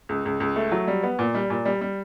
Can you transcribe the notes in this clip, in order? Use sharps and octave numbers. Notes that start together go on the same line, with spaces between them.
C#2
C#2
C#2
A3
F#3
G3
B3
A#2
G3
A#2
G3
G3